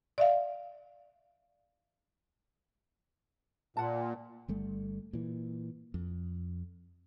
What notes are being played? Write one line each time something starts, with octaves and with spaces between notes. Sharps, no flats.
D5 E5 F5
A#2 F#5 A5
G1 G3 A3
A#2 E3
F2